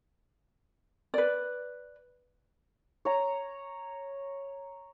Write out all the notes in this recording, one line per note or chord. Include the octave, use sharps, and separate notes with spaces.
B4 D5
C#5 A#5